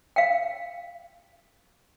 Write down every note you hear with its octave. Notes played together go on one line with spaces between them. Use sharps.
F5 G5